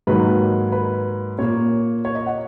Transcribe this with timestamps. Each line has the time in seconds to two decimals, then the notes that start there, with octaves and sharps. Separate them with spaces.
0.07 G#2 D#3 F#3 A#3 B4
0.72 B4
1.38 A#2 A#3 C#5
2.05 C#5
2.15 D#5
2.26 F#5